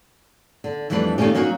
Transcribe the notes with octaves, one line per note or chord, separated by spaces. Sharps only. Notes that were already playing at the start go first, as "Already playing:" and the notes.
D3
F2 E3 G3 A3 D4 B4
D#3 A3 A#3 C#4 G4
F#3 A#3 C#4 D#4 F#4